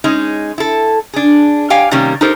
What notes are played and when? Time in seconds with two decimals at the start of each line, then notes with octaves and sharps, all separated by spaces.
0.04 G#3 C#4 D#4
0.58 E4 A4
1.14 D4 G#4
1.70 G4 C#5 F5 G5 G#5
1.91 C3 D#3 G3 A#3 C#4
2.21 D#4 G4 A4 A#4 C5